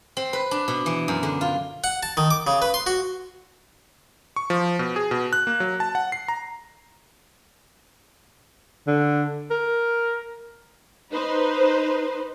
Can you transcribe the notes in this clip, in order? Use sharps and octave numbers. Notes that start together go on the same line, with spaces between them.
C4
B4
D4
B2
E3
F#2
D3
F4
F#5
A5
D#3
D6
C#3
B4
C6
F#4
C#6
F3
B2
G#4
B2
F#6
A#3
F#3
A5
F#5
C7
A#5
D3
A#4
D#4 B4 C5